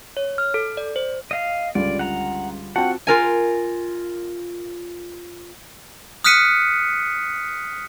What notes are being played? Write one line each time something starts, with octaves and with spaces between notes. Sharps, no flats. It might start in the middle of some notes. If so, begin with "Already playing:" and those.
C#5
F6
A4
D5
C5
D#5 F5
C#2 D3 G3 F4 D5
F#5 A#5
C4 F4 F#4 F#5 G5 A5
F4 A#4 G#5
D#6 F6 F#6 B6 C#7 D#7